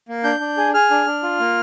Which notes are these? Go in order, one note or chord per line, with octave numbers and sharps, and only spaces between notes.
A#3
D4 G6
D4
G#4
G#4 F6
D4
D4
F4
A#3